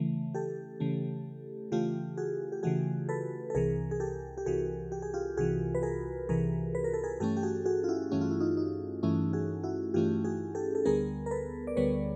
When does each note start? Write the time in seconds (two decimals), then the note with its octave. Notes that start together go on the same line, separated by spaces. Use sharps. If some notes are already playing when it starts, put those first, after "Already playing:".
Already playing: C#3 E3 A3
0.35 G4 A4
0.80 C#3 E3 A3
1.72 C#3 E3 A3 F4 G4
2.17 F#4 G#4
2.52 G4
2.63 C#3 E3 A3 F#4 G#4
3.09 A4 B4
3.50 A4
3.55 C2 C3 E3 G#4 A#4
3.91 G#4
4.00 G4 A4
4.37 G4
4.46 C2 C3 E3 F#4 G#4
4.92 G4
5.02 G#4
5.14 F4 G4
5.37 C2 C3 E3 F#4 G#4
5.75 B4
5.83 G#4 A#4
6.29 C2 C3 E3 G#4 A#4
6.75 B4
6.84 A#4
6.94 A4
7.04 G#4 A#4
7.20 G2 E3 A3 C#4 G4 A4
7.37 G4
7.43 F#4 G#4
7.65 F#4 G#4
7.84 F4
7.89 E4 F#4
8.11 G2 E3 A3 C#4 F#4
8.21 F4
8.31 E4
8.40 D#4 F4
8.57 D#4
9.03 G2 E3 A3 C#4 E4
9.33 F#4 G#4
9.63 E4 F#4
9.94 G2 E3 A3 C#4 F4 G4
10.24 F#4 G#4
10.55 G4 A4
10.75 A4
10.85 D2 D3 G3 B3 G#4 A#4
11.26 A#4
11.31 A4 B4
11.67 D5
11.76 D2 D3 G3 B3 B4 C#5